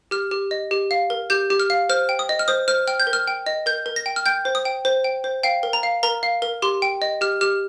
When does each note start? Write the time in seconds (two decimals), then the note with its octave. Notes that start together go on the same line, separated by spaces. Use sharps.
0.11 G4 F6
0.31 G4
0.51 D#5
0.71 G4
0.91 F5
1.10 A#4
1.30 G4 G6
1.50 G4
1.60 F6
1.70 F5
1.89 C5 F6
2.09 G5
2.19 D#6
2.29 D#5
2.39 F6
2.48 C5 D#6
2.68 C5 F6
2.87 G5 F6
3.00 G6
3.07 A#4
3.13 F6
3.28 G5
3.46 D#5
3.66 A#4 G6
3.86 A#4
3.96 A#6
4.06 G5
4.16 F6
4.26 G5 G6
4.45 C5
4.55 D#6
4.65 G5
4.85 C5
5.04 G5
5.24 C5
5.43 F5 G5
5.63 A#4
5.73 A#5
5.83 F5
6.03 A#4 A#5
6.23 F5
6.42 A#4
6.62 G4 C6
6.82 G5
7.02 D#5
7.21 G4 F6
7.41 G4 F6